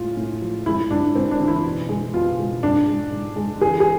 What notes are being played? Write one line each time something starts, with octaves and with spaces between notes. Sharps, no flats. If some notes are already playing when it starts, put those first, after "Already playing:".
Already playing: A2 G#3 F4
A2
F3
G#3 E4
G#2 D4
G#2 C4
D4
E3
E4
B2
G#3
B2 F4
G#3
G#2 D4
G#3
G#2
G#3
E3 G#4
G#4